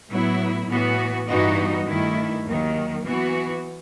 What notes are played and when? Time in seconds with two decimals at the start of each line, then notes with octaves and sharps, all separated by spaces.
0.09 A2 F#3 B3 E4
0.68 A2 E3 B3 F#4
1.27 G2 E3 B3 D#4 F#4
1.86 G2 D#3 A3 E4
2.46 D#2 D#3 F#3
3.04 E3 B3 F#4